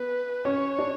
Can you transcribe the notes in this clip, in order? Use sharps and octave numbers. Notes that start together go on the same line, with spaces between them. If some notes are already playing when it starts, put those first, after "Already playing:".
Already playing: B3 B4
C#4 C#5
D4